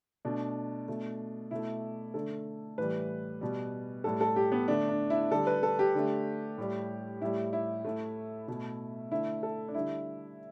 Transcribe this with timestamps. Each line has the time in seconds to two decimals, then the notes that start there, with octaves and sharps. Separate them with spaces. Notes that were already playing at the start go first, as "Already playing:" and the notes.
0.25 B2 A3 D4
0.88 B2 A3
1.51 B2 A3 E4
2.14 D3 A3 A4
2.78 A2 E3 G3 B4
3.41 B2 G3
4.04 A2 G3 A4
4.21 A4
4.36 G4
4.52 B3
4.68 D3 A3 D4
4.89 D4
5.10 E4
5.31 D3 G3 A4
5.47 B4
5.63 A4
5.79 G4
5.95 D3 A3
6.58 A2 G3
7.22 A2 G3 E4
7.53 E4
7.85 A2 A3
8.48 B2 A3
9.11 D3 A3 E4
9.43 A4
9.68 D4
9.75 D3 G3 E4